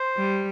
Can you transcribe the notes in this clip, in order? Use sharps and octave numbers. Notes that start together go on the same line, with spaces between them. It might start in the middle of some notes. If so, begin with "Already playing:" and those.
Already playing: C5
G3